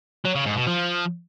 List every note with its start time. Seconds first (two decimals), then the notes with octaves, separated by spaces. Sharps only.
0.25 F#3
0.35 C#3
0.46 G#2
0.56 B2
0.67 F3